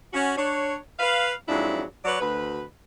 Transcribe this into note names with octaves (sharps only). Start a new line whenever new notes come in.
C#4 F#4
D4 C#5
B4 F5
F2 G#2 F#3 D4 E4
F#3 B4 C#5 D5
D2 B4